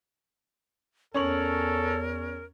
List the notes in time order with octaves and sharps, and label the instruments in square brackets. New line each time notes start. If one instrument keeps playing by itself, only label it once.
[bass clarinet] E2 [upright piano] C#4 C#6 F#7 [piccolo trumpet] A4 [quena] A#4